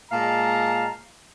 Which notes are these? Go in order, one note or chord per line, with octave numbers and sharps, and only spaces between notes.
A#2 G#3 F5 A5 A#5